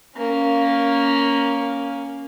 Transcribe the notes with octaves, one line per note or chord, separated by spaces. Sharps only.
A#3 C#4